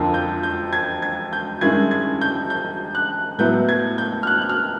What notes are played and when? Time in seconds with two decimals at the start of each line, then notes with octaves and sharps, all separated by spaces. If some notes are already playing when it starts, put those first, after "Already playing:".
Already playing: F2 D3 F3 A#3
0.14 G6
0.43 G6
0.73 G#6
1.02 G#6
1.33 G6
1.61 G2 D#3 G#3 C#4 E4 G#6
1.91 G#6
2.21 G6
2.50 G6
2.95 F#6
3.38 A2 F#3 B3 E4 G6
3.69 G#6
3.98 G6
4.23 F6
4.27 F#6
4.42 F#6
4.49 F6